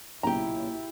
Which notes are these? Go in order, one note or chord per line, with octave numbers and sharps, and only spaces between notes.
B1 A#2 C#3 E4 G4 A#5